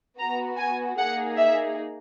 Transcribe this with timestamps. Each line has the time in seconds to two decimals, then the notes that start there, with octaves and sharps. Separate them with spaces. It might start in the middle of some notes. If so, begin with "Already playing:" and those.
0.19 B3 F#4 A#5
0.58 G#5
0.98 A#3 D#4 G#4 F#5
1.36 E5